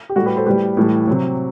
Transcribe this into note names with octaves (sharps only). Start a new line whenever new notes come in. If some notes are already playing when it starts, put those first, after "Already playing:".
G4
A2 G3 F#4 A4
G4 B4
A4 C5
A2 G3 G4 B4
A2 E3 G3
C3 F#3